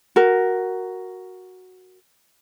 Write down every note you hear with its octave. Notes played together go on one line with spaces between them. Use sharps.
F#4 A#4